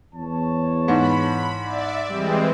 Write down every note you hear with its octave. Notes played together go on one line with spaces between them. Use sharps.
E2 C#5 A5
G#2 B5
D5 E5
E3 G3 G#3 C4